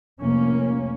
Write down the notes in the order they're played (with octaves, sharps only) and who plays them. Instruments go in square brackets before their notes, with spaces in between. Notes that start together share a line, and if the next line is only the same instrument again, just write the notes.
[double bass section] F1 A#3 C#4